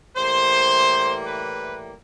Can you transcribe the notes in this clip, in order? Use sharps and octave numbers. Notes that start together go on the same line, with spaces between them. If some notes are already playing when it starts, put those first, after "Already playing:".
A2 E3 G3 A#3 C5
B4